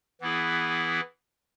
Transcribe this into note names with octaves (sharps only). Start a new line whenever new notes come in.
E3 B3 E4 G#4